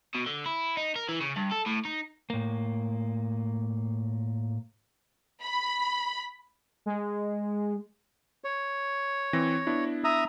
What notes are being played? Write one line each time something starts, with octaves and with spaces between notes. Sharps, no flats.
B2
D3
E4
D#4
A#4
E3
C#3
G2
A4
A2
D#4
A2 A#3
B5
G#3
C#5
E3 C4 A#6
B3 D4 E4
E5 A#5 D#6